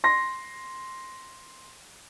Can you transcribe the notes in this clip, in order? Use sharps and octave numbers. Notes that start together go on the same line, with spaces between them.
C6 A#6